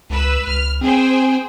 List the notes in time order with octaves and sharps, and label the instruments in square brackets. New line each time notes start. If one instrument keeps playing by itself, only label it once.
[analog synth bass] C#2 [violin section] B4 E6
[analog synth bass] C#2 [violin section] F6
[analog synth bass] C4 [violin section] G#4 C5 G5